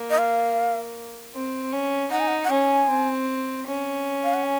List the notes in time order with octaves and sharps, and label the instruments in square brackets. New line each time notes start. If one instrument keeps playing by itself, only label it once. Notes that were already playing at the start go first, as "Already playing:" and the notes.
Already playing: [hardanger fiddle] A#3
[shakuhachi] D#5
F5
[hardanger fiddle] C4
C#4
[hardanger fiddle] D#4 [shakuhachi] F#5
[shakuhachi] G#5
F#5
F#5
[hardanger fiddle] C#4 [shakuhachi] G#5
[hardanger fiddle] C4
C#4
[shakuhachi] F5
F#5
G#5